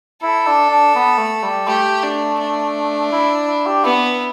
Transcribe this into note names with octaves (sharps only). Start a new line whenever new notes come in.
E4 A4
D4
D4
B3
A3
G3
A3 G4
D4
D4
E4
E4
G4
B3 E4